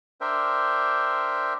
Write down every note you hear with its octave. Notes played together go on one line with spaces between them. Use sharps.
D4 A#4 C5 E5 G5